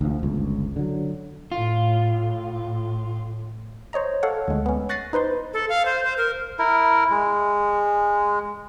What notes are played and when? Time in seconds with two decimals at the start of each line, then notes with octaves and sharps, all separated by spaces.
0.01 D2 F3
0.23 G1 C#2
0.76 D3 F#3
1.52 A2 F4
3.93 C5 C#5 D#5 A#5
4.23 A4 C#5 F5 F#5
4.48 D2 G#3
4.66 B3 C#4
4.89 C#6 F#6 A6 A#6 C7 D#7
5.13 D#4 B4 C5 C6
5.53 A4
5.69 F5
5.85 C5
6.04 C5
6.17 A#4
6.59 E4 A#4
7.10 G#3